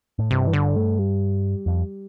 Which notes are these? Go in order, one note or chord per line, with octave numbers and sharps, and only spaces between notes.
A2
G2 C3
E3
D3
A3
G3
F2